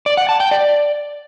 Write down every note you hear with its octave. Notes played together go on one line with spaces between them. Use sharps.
D5
F#5
A5
G5
D5